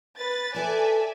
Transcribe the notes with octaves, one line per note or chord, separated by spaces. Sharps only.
B4 A6
A4 B4 D5 E5 G#5 A5